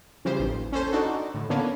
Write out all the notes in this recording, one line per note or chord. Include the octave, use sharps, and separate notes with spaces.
C#3 E3 F3 G3 G4 C5
A1 D#2
C#4 A4 C5
D4 D#4 F#4 A4
A2 D3
D3 A#3 B3 C#4 D4